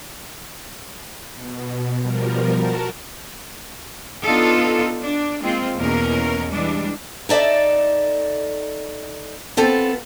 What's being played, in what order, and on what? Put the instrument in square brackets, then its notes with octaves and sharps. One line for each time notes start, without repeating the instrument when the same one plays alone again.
[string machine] B2
B2 F3 G3 A#4
F#4 A#4 A5
[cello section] B3 D4 D#4 F4 A4
D4
G#3 A#3 C4 F4
E2 B2 A#3 C#4 A#4
E3 G3 G#3 D4
[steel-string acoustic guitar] D#4 A4 D5 E5
B3 C4 F4 A4